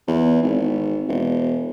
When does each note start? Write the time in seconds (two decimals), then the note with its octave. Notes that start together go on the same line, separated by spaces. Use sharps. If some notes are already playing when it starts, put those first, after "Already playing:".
0.07 E2
0.43 G#1
1.08 E1